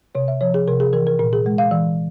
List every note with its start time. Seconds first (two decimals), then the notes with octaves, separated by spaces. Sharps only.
0.15 C3 C#5
0.28 E5
0.41 F3 C#5
0.54 G#4
0.68 C3 A#4
0.80 G#4
0.93 E3 A#4
1.07 A#4
1.19 A#2 A#4
1.33 G#4
1.46 G#3
1.58 F5
1.71 E3